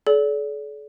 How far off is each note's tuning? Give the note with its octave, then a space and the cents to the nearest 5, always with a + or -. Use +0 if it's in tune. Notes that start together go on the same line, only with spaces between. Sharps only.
A4 -45 D5 -35